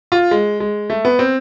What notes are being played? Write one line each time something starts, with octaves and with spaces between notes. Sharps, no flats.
F4
G#3
G#3
A3
B3
C4